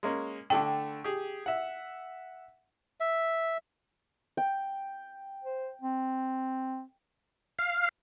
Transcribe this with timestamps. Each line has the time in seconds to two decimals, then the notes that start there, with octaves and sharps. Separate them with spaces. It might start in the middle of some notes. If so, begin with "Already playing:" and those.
0.03 G#3 A#3 C#4
0.50 D3 A3 D4 G5
1.04 G4 G#4
1.46 E5 F#5
3.00 E5
4.37 G5
5.44 C5
5.81 C4
7.59 F5